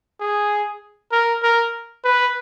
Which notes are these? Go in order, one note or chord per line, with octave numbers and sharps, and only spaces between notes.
G#4
A#4
A#4
B4